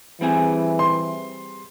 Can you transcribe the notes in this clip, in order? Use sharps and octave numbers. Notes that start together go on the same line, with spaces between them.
E3 G3 C4 G#4
C6